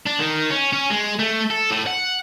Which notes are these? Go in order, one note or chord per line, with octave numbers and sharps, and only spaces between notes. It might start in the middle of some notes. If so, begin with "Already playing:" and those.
D4
D#3
C#4
C#4
G#3
A3
A4
A2
F#5